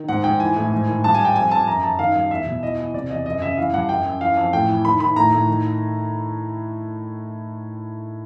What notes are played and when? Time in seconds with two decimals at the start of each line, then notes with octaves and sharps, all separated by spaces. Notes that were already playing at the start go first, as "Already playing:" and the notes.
Already playing: D#3
0.08 G#2 F#5
0.24 G#2 G5
0.40 E3 G#5
0.56 A2
0.72 G#2
0.88 D#3
1.04 G2 A5
1.14 G#5
1.20 G2
1.25 G5
1.36 F2 G#5
1.51 F2 A5
1.67 F#2 A#5
1.83 F#2 A5
1.99 D#3 F5
2.15 G2
2.31 E2 E5
2.46 B2
2.62 E3 D#5
2.78 E3
2.94 C3 D5
3.10 E2 D#5
3.26 F#2 D#5
3.42 C#3 E5
3.58 E3 F5
3.73 G2 F#5
3.89 F#2 G5
4.05 F#2
4.21 E3 F5
4.37 F2
4.53 A2 G5
4.69 E3
4.85 D#3 B5
5.00 D#3 B5
5.16 A2 A#5
5.32 A2
5.48 D#3